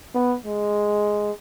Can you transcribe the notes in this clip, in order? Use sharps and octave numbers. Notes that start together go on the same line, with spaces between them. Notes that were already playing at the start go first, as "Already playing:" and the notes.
B3
G#3